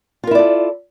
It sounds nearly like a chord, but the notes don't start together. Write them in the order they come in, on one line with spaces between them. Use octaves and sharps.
F4 A#4 E4 D5 A4